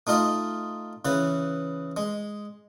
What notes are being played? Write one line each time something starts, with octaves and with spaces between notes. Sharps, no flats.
A3 D#4 F4 D#5
C#3 E3 B4
G#3